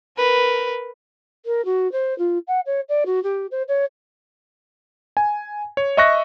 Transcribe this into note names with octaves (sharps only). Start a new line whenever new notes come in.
A#4 B4
A#4
F#4
C5
F4
F#5
C#5
D5
F#4
G4
C5
C#5
G#5
C#5
D#5 E5 C#6 F#6 A#6